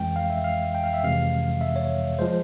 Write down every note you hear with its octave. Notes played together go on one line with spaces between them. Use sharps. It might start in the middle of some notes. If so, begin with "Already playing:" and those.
Already playing: F2 E3 G#3 G5
F5
E5
F5
G5
F5
E5
F2 C3 E3 G#3 F5
E5
C#5
F3 G#3 C5